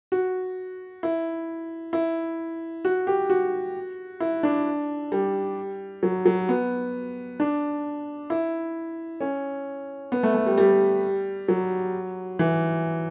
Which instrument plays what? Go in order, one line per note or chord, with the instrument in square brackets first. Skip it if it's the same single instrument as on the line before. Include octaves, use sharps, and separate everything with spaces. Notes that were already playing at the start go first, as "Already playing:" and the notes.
[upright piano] F#4
E4
E4
F#4
G4
F#4
E4
D4
G3
F#3
F#3
B3
D4
E4
C#4
B3
A3
A3
G3
G3
F#3
E3